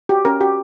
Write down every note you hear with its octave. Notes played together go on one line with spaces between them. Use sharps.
F#4 G4
C#4 A#4
F#4 G4